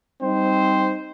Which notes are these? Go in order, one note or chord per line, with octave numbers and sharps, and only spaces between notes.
G3 C4 D#4 C5